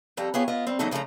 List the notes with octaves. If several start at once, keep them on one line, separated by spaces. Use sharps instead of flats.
F2 G3 A4 A#5
B3 F4 G4 G#4 C#5
B3 F4 D#5
G3 C4
E2 C#3 F#3 A3 D#4 A4
C#3 F3 A3 C#4 A#5